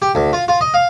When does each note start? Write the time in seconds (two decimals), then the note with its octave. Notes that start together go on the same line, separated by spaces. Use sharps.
0.02 G4
0.15 D2
0.33 F4
0.48 F4
0.61 D#5
0.74 F5